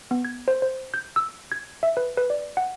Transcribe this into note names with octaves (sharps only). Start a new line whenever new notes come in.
B3
G#6
C5
C5
G6
E6
G#6
E5
B4
B4
D5
F#5